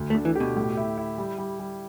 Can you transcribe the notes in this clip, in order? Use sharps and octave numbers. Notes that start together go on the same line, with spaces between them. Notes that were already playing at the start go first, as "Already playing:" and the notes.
Already playing: D2
A3
D3
E3
B2 G4
A2
E4
E4
G3
G3
G3